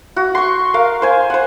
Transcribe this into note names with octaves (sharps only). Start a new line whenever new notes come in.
F#4
C6 C#6
A#4 F5
C5 G#5
C5 F#5